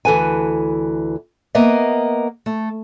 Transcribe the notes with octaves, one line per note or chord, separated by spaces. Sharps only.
D2 E3 A4 B4 G#5
A#3 B3 D#5 E5
A3